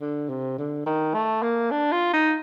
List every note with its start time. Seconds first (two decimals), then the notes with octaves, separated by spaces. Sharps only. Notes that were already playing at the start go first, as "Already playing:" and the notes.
0.01 D3
0.29 C3
0.58 D3
0.86 D#3
1.14 A3
1.43 A#3
1.71 D4
1.92 F4
2.13 D#4